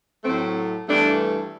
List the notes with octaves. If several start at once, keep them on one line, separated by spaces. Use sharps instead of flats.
A2 F#3 A3 C4
G2 E3 A3 B3 D4